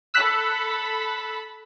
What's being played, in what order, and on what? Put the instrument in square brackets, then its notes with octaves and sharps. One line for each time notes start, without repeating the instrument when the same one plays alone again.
[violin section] A4 B5 [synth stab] E6 F#6 B6